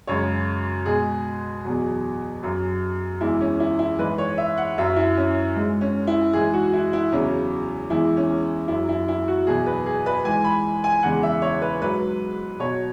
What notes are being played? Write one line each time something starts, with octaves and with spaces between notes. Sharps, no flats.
F#2 C#3 G#3 C#5
B2 G#3 G#4
E2 B2 F#3
F#2 F#3
E2 E3 G#3 E4
C#4
E4
E4
G#2 E3 G#3 B4
C#5
E5
F#5
F#2 F#3 E5
E4
C#4
G#2 G#3
C#4
E4
G#2 E3 G#3 G#4
F#4
E4
E4
E2 C#3 F#3 C#4
E2 E3 G#3 E4
C#4
F#2 E4
F#3
E4
E4
F#4
E2 B2 F#3 G#4
B4
G#4
B4
G#2 E3 G#3 G#5
B5
G#5
E2 C#3 E3 G#3 F#5
E5
C#5
B4
G#2 F#3 B4
B2 F#3 C#5